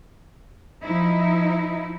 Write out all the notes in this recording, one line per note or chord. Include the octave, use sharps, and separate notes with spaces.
F3 D#4 E4